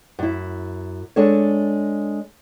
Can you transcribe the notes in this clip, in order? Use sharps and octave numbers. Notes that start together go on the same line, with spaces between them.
F#2 E4
G#3 D4 A4 C#5